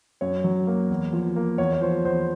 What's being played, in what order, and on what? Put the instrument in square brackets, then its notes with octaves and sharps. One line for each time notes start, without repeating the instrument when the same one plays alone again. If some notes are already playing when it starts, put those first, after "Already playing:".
[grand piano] F#2 C#5
F#3
A#3
E2
F3
A#3
E2 C#5
C#5
F3 C5
E2 C5